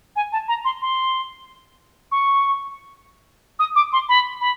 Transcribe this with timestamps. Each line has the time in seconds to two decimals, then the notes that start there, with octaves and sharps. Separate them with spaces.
0.16 G#5
0.32 A5
0.48 A#5
0.65 C6
0.82 C6
2.12 C#6
3.59 D#6
3.76 D6
3.93 C6
4.09 B5
4.41 B5